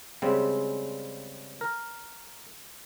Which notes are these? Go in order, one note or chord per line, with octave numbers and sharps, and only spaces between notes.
C#3 G3 G#3 C4
A#4